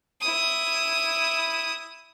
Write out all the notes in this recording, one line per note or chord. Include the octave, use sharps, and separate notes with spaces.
E4 D#6